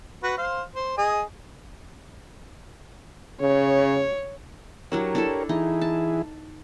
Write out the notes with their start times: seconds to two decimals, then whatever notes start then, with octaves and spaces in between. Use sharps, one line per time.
0.23 F#4 B4
0.38 C5 F5
0.76 C5
0.98 G#4 D#5 G#5
3.41 C#3 C#5
4.92 F#3 D4 E4 G4 A#4 C#5
5.15 D4 E4 A4
5.49 E3 D#4 E4 G#4
5.81 A5